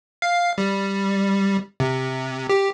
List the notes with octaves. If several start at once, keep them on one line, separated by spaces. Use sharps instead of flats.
F5
G3
C3
G4